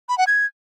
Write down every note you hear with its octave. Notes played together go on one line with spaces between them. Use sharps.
B5
F#5
G#6